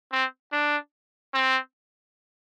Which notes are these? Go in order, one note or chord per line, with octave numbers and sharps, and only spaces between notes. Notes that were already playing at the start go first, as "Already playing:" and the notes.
C4
D4
C4